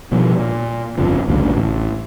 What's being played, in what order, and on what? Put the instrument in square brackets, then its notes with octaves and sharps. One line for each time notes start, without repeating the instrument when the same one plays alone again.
[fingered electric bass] B2 F3 G3
A#2
G1 F2 C#3 F3
A1 D2 G2 C#3
A1